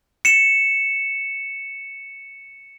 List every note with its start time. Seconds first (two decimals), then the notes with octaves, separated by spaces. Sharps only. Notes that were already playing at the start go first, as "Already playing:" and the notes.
0.25 C#7 E7